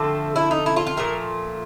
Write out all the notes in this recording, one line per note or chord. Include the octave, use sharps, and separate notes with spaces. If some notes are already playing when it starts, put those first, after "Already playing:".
Already playing: D3 F3 A3 C4 A4
E4
D#4
E4
F4
F4
A#2 F3 A3 A#4